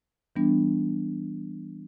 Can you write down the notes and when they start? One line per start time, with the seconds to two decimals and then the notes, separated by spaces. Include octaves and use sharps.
0.36 E3 G3 B3 D4